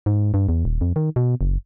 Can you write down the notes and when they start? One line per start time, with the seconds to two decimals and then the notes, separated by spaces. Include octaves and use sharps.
0.06 G#2
0.34 G2
0.49 E2
0.65 D#1
0.81 F2
0.96 D#3
1.16 B2
1.41 F#1